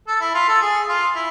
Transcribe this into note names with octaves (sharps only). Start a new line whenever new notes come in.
A4
E4
F4
A4
G#4
F4
E4